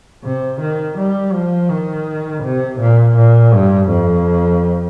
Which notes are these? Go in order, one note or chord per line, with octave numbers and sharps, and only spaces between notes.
C3
D#3
G3
F3
D#3
C3
A#2
A#2
G2
F2